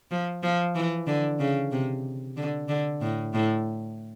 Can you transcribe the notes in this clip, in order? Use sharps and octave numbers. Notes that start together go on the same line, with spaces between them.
F3
F3
E3
D3
C#3
C3
D3
D3
A2
A2